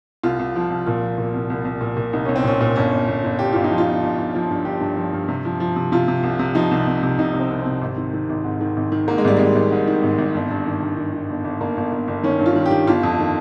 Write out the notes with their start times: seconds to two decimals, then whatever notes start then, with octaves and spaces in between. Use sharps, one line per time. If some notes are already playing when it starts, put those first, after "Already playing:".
0.23 C2 F4
0.39 C2
0.56 F3
0.70 C2
0.86 A#2 F4
1.02 F3
1.18 A#2
1.34 C2
1.50 C2
1.65 C2
1.81 A#2
1.97 A#2
2.13 C2 D#4
2.25 C2 C#4
2.36 C4
2.44 A#2 C#4
2.61 A#2
2.76 G1 C#4
2.92 G1
3.08 G1
3.24 G1
3.39 G1 G4
3.53 G1 F4
3.64 D#4
3.71 F3
3.78 F4
3.87 G1
4.02 G1
4.18 G1
4.35 F3
4.51 G2
4.65 G1 G4
4.81 G2
4.97 F3
5.13 G2
5.28 C3
5.45 F3
5.60 F3
5.76 C3
5.92 C3 F4
6.08 C3
6.23 C2
6.39 C3
6.55 F3 D#4
6.71 C2
6.87 C2
7.03 C3
7.18 C2 D#4
7.34 C3
7.40 C4
7.51 C2
7.61 C4
7.67 C3
7.81 G#1
7.97 D#3
8.13 D#3
8.29 G#1
8.44 G#2
8.61 D#3
8.76 G#1
8.92 D#3
9.08 G#2 A#3
9.18 G#3
9.24 G#1 G3
9.37 G#1 G#3
9.55 G#1
9.72 G#2
9.87 D#3
10.03 G#1
10.18 G#1
10.34 G1
10.50 G2
10.67 D#3
10.82 G2
10.97 D#3
11.13 D#3
11.30 G1
11.44 G1
11.60 G1 A#3
11.77 G1
11.92 G1
12.08 G1
12.23 D#3 C#4
12.39 G2
12.46 F4
12.56 D#3
12.66 G4
12.71 D#3
12.87 G1 F4
13.03 F2
13.19 D#3